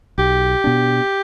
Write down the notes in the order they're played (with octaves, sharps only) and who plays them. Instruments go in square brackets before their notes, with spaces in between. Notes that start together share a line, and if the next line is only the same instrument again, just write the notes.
[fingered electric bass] B1 [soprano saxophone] G4
[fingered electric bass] B2 B3 D4